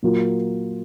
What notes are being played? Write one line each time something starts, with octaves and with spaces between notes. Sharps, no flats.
A#2 F#3 A#3 F4